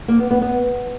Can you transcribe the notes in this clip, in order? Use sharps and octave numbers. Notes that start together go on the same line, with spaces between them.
A#3
B3
B3
B3